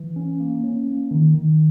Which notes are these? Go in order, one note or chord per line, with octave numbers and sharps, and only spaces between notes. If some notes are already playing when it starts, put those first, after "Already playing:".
Already playing: E3
C#4
A#3
C#4
A#3
D#3
D#3